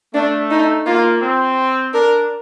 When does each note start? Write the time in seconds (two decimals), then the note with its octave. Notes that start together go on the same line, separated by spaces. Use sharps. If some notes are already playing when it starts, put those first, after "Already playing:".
0.14 A3 D4
0.51 D#4
0.86 A#3 F4
1.22 C4
1.94 D4 A#4